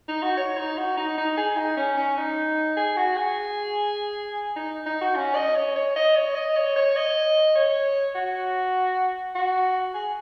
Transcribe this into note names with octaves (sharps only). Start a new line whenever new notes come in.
D#4
F#4
C#5
D#4
F#4
D#4
D#4
G#4
D#4
C#4
C#4
D#4
G#4
F#4
G#4
D#4
D#4
F#4
C#4
D#5
C#5
C#5
D#5
C#5
D#5
C#5
C#5
D#5
C#5
F#4
F#4
G#4